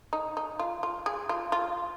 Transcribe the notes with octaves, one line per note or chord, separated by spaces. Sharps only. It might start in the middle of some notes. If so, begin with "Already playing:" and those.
D#4
D#4
F4
F4
G#4
F4
F4